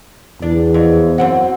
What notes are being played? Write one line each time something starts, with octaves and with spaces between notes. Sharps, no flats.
E2 D4
F2
F#2 C4 F#4